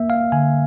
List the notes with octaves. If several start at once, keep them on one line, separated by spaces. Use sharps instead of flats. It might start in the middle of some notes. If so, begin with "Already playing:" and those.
Already playing: A#3 E5
F5
D3 G#5